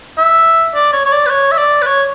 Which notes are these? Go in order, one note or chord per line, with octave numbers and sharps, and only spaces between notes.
E5
D5
C#5
C#5
D5
B4
C#5
E5
D5
B4
C#5